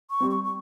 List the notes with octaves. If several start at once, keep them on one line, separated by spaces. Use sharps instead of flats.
C#6
G3 C4
C#6
C#6